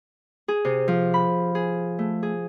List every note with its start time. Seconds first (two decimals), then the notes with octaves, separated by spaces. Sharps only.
0.48 G#4
0.65 C3
0.88 F3
1.14 B5
1.55 G#4
1.99 A3
2.23 G#4